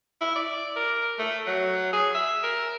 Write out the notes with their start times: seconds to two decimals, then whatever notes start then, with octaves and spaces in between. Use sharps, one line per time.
0.21 E4
0.36 D5
0.76 A#4
1.19 A3
1.47 F#3
1.93 G#4
2.14 E5
2.43 A#4